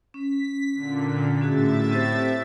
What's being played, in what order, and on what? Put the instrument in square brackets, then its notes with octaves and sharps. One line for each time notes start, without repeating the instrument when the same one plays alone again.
[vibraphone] C#4 [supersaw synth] B6
[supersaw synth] A#2 D3
[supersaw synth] A2 E5 A6 [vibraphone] C#4 F#4 G#4
[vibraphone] C4 G4 C5